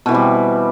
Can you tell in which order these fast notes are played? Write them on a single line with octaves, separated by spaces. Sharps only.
B2 E3 C4 G3